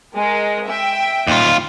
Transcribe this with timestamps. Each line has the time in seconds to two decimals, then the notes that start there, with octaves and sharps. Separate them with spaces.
0.15 G#3 A#4
0.68 E5 G5
1.27 D#2 F4